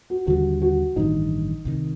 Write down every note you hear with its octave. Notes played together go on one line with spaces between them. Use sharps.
F#4
D#2 D3 G3 F#4
F#4
A1 G2 D#3 D#4
C2 C3 D#3